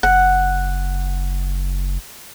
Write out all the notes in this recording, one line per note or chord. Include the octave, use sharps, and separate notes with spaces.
F#1 F#5